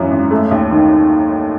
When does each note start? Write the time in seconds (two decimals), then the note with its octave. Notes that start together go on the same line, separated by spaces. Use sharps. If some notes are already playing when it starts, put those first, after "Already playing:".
Already playing: G#1 F#2 E3
0.11 G#1
0.31 A3
0.51 D#2
0.71 D#3